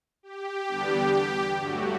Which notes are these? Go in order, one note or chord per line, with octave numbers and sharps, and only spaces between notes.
G4
E2 D3 G3 B3 D4
G2 F#3 A3 F#4